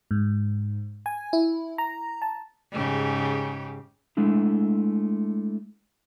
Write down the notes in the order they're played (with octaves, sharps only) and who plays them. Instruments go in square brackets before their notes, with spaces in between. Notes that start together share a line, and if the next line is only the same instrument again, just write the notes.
[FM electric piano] G#2
G#5
E4
A#5
A5
[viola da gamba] G#2 C#3 G4
[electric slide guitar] G#3 A3 D4 E4